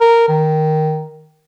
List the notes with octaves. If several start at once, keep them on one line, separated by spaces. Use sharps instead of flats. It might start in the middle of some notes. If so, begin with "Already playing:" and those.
A#4
D#3